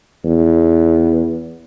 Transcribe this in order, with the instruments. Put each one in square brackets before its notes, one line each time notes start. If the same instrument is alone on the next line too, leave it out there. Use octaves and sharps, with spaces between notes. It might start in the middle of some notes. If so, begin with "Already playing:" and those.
[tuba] E2